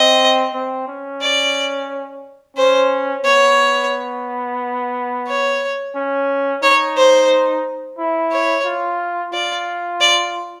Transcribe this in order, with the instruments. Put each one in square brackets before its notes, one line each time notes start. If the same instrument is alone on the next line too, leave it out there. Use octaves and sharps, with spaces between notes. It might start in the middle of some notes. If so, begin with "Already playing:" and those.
Already playing: [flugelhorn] C4 [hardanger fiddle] D#5
[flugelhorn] C4
C#4
[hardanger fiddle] D5
[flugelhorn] C#4 [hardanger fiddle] C5
[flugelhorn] B3 [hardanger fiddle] C#5
[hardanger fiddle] C#5
[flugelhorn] C#4
[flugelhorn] D#4 [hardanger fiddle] C#5
[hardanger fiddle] C5
[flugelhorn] E4
[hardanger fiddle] C#5
[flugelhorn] F4
[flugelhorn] F4 [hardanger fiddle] D5
[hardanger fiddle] D5